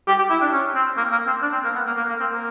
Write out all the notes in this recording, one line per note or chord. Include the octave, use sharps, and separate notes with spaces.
G4
G4
E4
D4
C#4
C4
A#3
A#3
C4
D4
C4
A#3
B3
A#3
A#3
A#3
C4
A#3